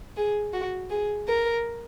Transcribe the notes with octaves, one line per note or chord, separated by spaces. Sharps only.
G#4
F#4
G#4
A#4